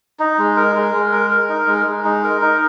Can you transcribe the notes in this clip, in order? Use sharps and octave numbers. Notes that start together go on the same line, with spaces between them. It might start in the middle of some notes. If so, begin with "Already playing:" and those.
D#4
G#3
A#4
G#3
G#3
A#4
A#4
D#4
G#3
G#3
D#4
A#4
D#4